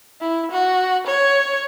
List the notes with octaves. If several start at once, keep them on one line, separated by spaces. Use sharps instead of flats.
E4
F#4
C#5